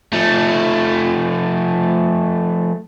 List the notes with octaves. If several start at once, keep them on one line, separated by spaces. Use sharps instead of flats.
F3 A3